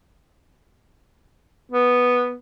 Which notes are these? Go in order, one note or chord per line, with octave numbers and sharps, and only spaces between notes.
B3